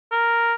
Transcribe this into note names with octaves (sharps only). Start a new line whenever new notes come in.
A#4